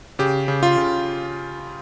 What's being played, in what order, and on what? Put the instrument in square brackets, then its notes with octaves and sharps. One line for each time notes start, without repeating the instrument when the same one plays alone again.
[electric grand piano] C#3 G4
C#3
F4
C#3